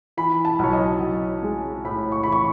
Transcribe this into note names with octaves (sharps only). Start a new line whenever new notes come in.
E3 B5
A5
B1 C#5
D#5
B1
G#3
A2 B5
C#6
E3 B5
C#6